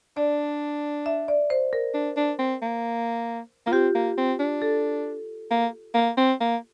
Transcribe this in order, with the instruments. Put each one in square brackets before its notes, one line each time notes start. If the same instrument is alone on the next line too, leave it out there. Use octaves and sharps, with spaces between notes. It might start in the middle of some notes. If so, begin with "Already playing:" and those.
[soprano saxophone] D4 [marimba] D5
[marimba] E5
D5
C5
A#4
[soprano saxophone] D4
D4
C4
A#3
[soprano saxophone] A#3 [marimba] F4
[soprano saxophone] C4 [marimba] G4
[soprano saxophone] A#3
C4
D4
[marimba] A4
[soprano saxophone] A#3
A#3
C4
A#3